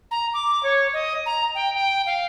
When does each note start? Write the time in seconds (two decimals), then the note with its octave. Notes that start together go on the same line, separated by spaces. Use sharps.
0.11 A#5
0.34 D6
0.63 C#5
0.93 D#5
1.26 A#5
1.55 G5
1.75 G5
2.06 F5